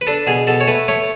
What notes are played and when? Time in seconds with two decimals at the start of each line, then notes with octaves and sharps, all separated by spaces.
0.01 B4
0.07 D4 A4
0.27 B2 G#4
0.47 B2 A4
0.61 C#5
0.68 A3 B4
0.88 A3 C#5